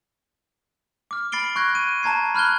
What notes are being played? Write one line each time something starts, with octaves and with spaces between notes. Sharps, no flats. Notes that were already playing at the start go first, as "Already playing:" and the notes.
D6 F6
B5 A6 C7 D7 G7
C#6 F#6 G#6 A#6
F#6 D#7
A5 A#5 G#6 C7
B5 F6 F#6 G#6 G7